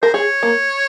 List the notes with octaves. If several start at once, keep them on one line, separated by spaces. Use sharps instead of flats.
A#4 C5
G#4 C#5
A#3